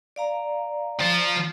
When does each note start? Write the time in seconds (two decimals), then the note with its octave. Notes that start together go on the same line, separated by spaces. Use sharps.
0.16 D5 F5 A#5
1.00 F3 F4